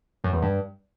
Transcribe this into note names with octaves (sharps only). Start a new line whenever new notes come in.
F#2
E2
G2